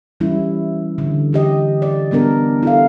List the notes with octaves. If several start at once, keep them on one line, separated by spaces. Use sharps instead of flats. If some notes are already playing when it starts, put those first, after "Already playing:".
E3 G3 C#4 E4
D3
E3 G4 D#5
D5
G3 B3 D4 A#4
E4 A4 F5